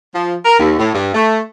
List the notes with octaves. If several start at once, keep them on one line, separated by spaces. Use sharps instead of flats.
F3
A#4
D#2
A2
G2
A3